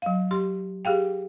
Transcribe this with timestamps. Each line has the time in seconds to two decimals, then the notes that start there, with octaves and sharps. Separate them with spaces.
0.02 F#3 F5
0.31 G4 C6
0.85 G4 G#4 F5 G5